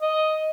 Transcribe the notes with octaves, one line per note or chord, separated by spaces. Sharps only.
D#5